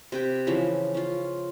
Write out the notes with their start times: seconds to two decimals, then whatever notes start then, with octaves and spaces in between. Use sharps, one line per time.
0.12 C3 B4 G5
0.47 C#3 E3 F3 B5
0.94 C#4 F4